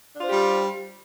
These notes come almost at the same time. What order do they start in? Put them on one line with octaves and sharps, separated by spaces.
D4 F4 C5 G4 G3